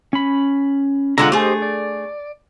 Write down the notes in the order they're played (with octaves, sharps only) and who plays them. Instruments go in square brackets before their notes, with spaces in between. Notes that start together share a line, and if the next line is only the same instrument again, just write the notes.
[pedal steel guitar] C#4 B5
[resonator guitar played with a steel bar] D3 G#3 F4 [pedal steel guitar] F#5 A5 A#5
[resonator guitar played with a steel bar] A3 G#4 [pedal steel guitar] G4 C5 D#5
[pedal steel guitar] D5